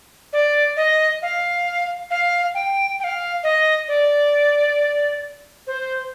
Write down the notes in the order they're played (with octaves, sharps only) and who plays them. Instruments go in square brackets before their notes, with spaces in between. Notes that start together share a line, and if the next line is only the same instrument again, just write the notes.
[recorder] D5
D#5
F5
F5
G5
G5
F5
D#5
D5
C5